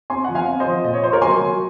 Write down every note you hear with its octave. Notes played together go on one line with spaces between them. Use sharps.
C4 G#5 C6
F3 F#5
F5 G#5
C4
C5 D#5
F3
A#2 D#5
C#5
F4 C5
A#4 C#5
F#3 G#5 C6
F#3